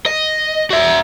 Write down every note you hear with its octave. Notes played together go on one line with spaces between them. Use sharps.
D#5
F#4 E5